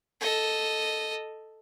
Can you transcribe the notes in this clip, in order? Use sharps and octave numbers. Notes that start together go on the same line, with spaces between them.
A4 D#5